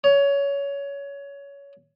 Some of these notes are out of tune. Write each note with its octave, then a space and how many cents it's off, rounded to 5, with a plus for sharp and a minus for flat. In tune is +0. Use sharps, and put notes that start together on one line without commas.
C#5 +20